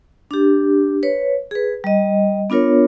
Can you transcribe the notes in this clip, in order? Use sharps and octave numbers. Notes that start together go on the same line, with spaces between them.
D4 G4
B4 C#5
G#4 B4
G3 D#5
B3 D4 F4 A#4 C#5